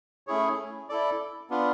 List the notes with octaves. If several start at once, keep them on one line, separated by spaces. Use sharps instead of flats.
A3 C#4 E4 G#4 C#5
E4 A4 D5
B3 D4 F4